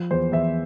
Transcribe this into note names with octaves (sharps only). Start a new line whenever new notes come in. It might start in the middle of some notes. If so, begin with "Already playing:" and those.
Already playing: F3
E2 C5
E2 E5